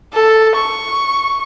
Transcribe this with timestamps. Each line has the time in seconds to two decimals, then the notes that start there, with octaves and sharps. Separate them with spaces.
0.13 A4
0.55 C#6